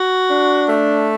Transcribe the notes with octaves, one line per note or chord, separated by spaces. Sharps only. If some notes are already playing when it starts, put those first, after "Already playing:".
Already playing: F#4
D4
A3